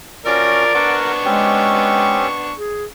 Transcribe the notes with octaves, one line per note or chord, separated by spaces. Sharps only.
F3 C#4 F#4 A#4 D5 F6
B3 D4 A#4 F#5 C#6
G#3 C4 C#4 G4
G#4